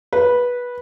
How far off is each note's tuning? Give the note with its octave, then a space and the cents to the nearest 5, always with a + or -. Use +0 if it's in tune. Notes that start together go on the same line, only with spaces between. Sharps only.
B4 -15